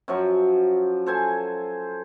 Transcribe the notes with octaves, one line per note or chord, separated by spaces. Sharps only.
F#2 F3 F#3 C#6
A4 C5 G#5